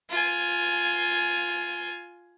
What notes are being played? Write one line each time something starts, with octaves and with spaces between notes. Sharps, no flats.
F4 G#5